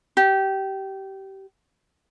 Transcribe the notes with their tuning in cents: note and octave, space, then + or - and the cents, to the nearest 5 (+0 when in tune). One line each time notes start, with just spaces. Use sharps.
G4 -20